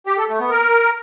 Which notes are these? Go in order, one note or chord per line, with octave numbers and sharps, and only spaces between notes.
G4
A4
A3
B3
A#4